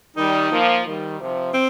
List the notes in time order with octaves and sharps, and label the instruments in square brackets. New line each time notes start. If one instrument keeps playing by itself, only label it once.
[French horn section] D#3 G3 [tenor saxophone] D#4
[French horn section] F3 A#3
D#3 G3
C3 F3
[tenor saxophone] C4